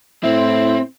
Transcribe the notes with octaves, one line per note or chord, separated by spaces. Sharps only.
A2 C4 E4